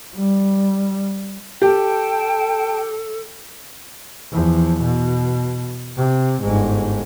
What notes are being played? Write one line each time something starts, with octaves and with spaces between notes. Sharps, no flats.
G3
G4 A4 G5 A5
E2 F3
B2
C3
G1 G#2